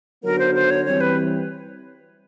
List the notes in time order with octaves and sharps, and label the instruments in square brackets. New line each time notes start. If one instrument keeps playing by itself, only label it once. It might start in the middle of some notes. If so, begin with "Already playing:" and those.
[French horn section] D3 F#3 B3 D#4 F#4 [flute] A#4
[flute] C5
C5
C#5
[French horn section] E3 G3 C4 [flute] C#5
[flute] B4